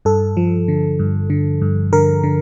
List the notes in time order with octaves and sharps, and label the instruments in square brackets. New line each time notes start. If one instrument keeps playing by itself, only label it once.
[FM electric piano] G2 A4
F3
D3
G2
D3
G2
D3 A#4
D3